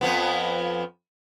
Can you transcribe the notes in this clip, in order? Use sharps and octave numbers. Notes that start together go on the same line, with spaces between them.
F2 F3 B3